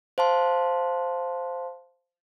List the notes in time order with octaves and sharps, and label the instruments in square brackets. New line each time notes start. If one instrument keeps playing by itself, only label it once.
[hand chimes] C5 F5 A5 C6